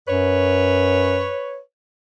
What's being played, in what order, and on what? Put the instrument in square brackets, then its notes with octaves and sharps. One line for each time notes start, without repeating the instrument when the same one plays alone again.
[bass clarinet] F#2 [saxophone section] B4 C#5